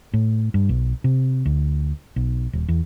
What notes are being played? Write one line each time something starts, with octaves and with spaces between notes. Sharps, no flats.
A2
G2
B1
C3
D2
B1
D#1
E2